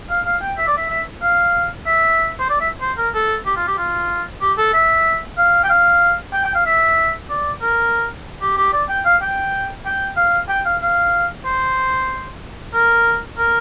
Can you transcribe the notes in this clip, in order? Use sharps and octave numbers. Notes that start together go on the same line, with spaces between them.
F5
F5
G5
E5
D5
E5
E5
F5
E5
C5
D5
E5
C5
A#4
A4
G4
F4
G4
F4
G4
A4
E5
F5
G5
F5
G5
G5
F5
E5
D5
A#4
G4
G4
D5
G5
F5
G5
G5
F5
G5
F5
F5
C5
A#4
A#4